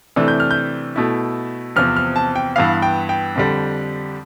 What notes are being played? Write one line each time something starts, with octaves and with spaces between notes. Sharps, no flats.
C3 E3 A3 D4
G6
F6
G6
B2 A3 E4
E2 C3 F3 C4 F6
F6
A5
G5
G2 E3 B3 F5
G5
G5
F2 D3 G3